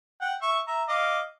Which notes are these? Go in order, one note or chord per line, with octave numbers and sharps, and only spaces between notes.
F#5 G5
E5 C#6
E5 A#5
D#5 F5 D6